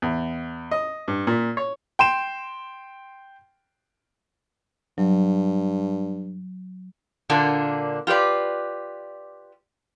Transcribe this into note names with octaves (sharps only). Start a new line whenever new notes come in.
E2
D#5
G2
A#2
C#5
G5 C6 E7
G2 F#3
A#2 D3 A#3 D4
F4 G4 B4 D5